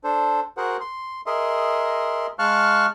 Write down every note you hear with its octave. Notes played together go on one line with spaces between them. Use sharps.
D4 A4 C5
F#4 G#4 A#4 C5 F#5
C6
G#4 A#4 D#5 E5 C6
G#3 F5 A5 C#6 F6 F#6